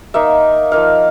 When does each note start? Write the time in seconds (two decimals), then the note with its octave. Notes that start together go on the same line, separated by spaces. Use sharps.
0.14 A#3 D#4 E5
0.72 F3 A#3 D#4 F5